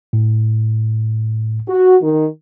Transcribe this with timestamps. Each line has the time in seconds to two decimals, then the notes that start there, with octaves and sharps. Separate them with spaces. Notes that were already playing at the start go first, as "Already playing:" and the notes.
0.13 A2
1.68 F#4
2.03 D#3